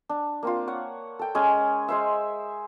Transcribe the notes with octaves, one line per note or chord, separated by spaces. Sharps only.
D4
A#3 C4 F4
C#5 F#5
A4 G5
G#3 C#4 G#5
G#3 C5 E5